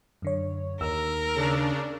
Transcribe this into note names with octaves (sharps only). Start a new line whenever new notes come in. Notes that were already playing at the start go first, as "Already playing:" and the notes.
F#2 D3 C#5
D#2 A#4 E6
C#3 D4